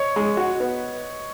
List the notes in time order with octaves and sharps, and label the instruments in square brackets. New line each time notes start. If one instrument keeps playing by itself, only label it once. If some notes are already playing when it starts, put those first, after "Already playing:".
Already playing: [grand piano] C#5 D#5
[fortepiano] G#3
F#4
B3